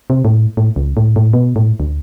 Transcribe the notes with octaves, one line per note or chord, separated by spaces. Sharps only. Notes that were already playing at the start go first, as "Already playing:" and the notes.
C3
A2
A2
C#2
A2
A2
B2
A2
D2